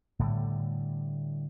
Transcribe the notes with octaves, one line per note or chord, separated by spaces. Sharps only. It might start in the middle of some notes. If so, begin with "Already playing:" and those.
A2 D3 G3